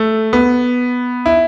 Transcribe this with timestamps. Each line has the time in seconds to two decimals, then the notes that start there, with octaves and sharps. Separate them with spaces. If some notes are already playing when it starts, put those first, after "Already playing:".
Already playing: A3
0.33 B3
1.26 E4